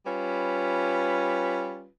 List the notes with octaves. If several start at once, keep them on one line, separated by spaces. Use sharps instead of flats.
G3 C#4 F4 B4